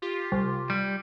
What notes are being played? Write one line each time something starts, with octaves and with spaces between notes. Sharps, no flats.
F4 G4
C2
G3